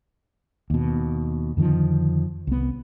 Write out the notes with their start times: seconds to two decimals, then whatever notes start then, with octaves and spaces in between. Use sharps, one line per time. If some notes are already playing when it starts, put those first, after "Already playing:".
0.70 D#2 B2
1.57 F2 D3 D#3 F3
2.47 C2 B3